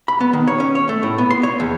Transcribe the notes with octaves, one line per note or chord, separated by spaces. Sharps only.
B5
B3
D#3
C#5
C#4
C#5
A3
A2
B3
C6
C#5
E2